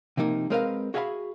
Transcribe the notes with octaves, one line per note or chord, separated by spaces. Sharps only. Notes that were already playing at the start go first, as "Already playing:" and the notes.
C3 F3 A#3 D#4
G#3 C4 A#4 B4 D#5 F5
F#4 G#4 E5 F5 G#5 B5